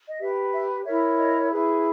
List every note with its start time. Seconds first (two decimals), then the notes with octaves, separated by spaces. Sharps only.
0.09 D#5
0.20 G4 B4 E5
0.53 E5
0.85 E4 A#4 C#5 E5
1.18 D#5
1.51 E4 G#4 B4